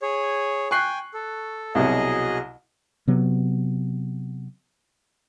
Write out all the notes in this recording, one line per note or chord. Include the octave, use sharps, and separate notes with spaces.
G#4 C#5
G5 G#5 C#6 F#6 C7
A4
C2 B2 F#3 G#4 D#5
C3 F#3 B3